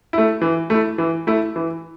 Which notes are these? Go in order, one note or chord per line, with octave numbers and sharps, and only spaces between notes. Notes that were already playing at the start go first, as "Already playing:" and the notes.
A3 E4
E3
A3 E4
E3
A3 E4
E3